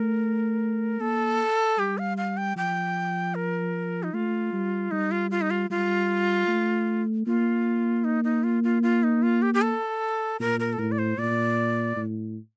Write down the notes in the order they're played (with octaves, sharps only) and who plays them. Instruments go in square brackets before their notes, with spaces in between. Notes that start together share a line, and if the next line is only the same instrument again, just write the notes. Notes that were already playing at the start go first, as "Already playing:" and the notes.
Already playing: [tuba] A3 [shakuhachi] A#4
[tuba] A#3 [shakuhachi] A4
[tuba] G3 [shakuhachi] G4
[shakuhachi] F5
F5
G5
[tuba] F3 [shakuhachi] G5
[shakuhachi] A#4
D#4
[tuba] A3 [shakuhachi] F4
[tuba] G3
[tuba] G3 [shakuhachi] D#4
[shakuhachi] F4
F4
D#4
F4
[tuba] G3 [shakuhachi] F4
[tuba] A3
[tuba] A#3 [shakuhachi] F4
[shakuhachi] D#4
D#4
F4
F4
F4
D#4
F4
G4
G4
A4
[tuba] A#2 [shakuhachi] A#4
[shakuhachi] A#4
A4
[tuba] A2 [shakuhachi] A#4
[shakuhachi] D5
C5
[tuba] A#2 [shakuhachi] D5
[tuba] A2